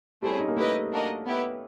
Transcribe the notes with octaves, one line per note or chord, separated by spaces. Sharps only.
G3 A3 C4 E4 G#4
C#4
D#4
A#3
A3 E4 G4 B4 D#5
A#3 D4 F#4 A#4 D#5
B3 E4 G4 B4